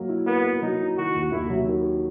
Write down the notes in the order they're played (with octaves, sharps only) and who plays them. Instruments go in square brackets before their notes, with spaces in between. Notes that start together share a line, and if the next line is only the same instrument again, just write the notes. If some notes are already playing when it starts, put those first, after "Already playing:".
Already playing: [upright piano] F#3 A#3 A#4
E4
[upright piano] A#3 [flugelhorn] B3
[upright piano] A#4
[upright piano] F#3 [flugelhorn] D#4
[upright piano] E4
[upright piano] D#3 [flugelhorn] F#4
[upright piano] D#2
[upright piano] D#2 [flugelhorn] E4
[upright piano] F#3
D#3